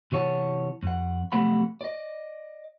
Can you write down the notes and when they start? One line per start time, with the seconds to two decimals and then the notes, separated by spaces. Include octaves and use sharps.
0.12 C3 E3 C#5 F#5 A5
0.83 F2 F#5
1.32 B1 C3 F3 A3 F#5 B5
1.81 D5 D#5